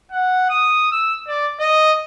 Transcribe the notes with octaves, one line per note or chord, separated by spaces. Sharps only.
F#5
D#6
E6
D5
D#5